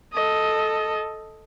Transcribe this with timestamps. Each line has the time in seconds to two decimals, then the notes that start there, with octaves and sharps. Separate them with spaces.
0.13 A4 D#5